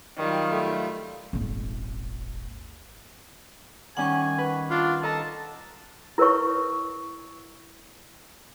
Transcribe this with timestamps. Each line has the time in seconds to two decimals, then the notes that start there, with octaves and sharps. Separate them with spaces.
0.17 D#3 F#3 G3 F4
0.51 A3
1.33 D#1 G#1
3.97 D#3 G3 C#4 F#5 G#5 C#6
4.38 B4
4.71 D4 F4
5.03 A4 D#5 A5 A#5
6.18 E4 A#4 B4 C#5 C#6